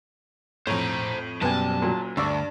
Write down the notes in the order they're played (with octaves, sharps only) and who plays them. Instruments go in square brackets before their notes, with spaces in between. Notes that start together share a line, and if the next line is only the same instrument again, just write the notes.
[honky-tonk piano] F2 A2 [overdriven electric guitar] C5 A#5 [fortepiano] C#5
[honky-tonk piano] F#1 [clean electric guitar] F#2 B2 G3 [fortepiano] B3 G#5 [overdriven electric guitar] A5
[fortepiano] A#2 F#3
[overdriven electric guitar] D2 [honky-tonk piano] G2 [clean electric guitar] D4 [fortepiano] D5 C#6 E6